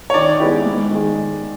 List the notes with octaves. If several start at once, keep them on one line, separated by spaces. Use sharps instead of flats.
C#5
D#3 D5
G#3 B3 E4 G4
G#2
D#3 G#3